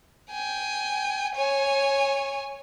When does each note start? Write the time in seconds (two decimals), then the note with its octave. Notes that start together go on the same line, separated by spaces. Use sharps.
0.31 G5 G#5
1.35 C#5 G#5